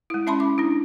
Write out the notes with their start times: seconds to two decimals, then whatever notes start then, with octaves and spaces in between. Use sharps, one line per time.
0.10 G#3 E4
0.27 C#4 E5 A5 B5 C6
0.40 D6
0.58 D4 E4